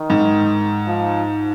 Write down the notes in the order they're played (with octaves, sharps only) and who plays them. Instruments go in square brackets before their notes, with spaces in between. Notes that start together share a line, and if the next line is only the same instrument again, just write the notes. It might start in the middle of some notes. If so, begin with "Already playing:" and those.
Already playing: [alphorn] D#3
[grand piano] G#2
[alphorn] F3